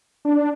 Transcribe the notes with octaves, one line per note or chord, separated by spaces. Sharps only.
D4